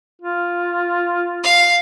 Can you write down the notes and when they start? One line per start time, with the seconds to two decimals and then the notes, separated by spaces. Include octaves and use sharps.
0.21 F4
1.44 F5